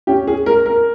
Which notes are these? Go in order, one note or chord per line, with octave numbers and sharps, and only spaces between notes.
C#4 G4
G#4
G#3 A#4
A#4